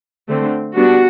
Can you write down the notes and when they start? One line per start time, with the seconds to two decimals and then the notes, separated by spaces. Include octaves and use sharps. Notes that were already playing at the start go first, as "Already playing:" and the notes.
0.29 D3 A3 C4
0.75 G3 B3 D4 F#4